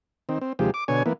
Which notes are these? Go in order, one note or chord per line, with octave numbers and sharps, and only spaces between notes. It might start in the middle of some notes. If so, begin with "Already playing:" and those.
D#3 C4
C4
D#2 C3 F3 G#3 G4
D6
B2 D3 C#5 G#5
E3 A#3 B3